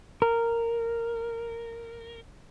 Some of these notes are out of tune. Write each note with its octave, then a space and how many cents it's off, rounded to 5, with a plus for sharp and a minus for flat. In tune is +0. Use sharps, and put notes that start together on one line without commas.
A#4 -10